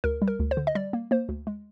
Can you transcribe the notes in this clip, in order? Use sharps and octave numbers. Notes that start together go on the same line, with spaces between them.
D2 A#4
G3
A#4
D2
C5
D3
D#5
G3 D5
A#3
A#3 C5
D2
G#3